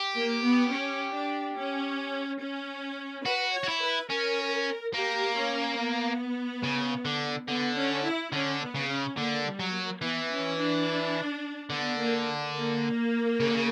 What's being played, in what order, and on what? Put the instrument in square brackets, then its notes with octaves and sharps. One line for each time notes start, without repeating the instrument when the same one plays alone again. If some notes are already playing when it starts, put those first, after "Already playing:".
Already playing: [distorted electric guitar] G4
[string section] A#3
B3
C#4
D4
C#4
C#4
[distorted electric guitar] F#4 [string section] B4
[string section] C#5
[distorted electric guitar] F#4
E4
[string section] B4
[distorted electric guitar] C#4 [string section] A#4
[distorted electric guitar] A#3 [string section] G4
[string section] C#4
B3
[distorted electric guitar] C#3
D3
[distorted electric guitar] D3 [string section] B3
[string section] C#4
E4
[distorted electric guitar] D3 [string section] C#4
[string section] B3
[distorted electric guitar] C#3
[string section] C#4
[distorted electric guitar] D3 [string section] A#3
[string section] G3
[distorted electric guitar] F#3
[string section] A#3
[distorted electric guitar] E3 [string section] B3
[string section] C#4
D4
[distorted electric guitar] D3 [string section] B3
[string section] A#3
A#3
[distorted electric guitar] C#3
D3
C#3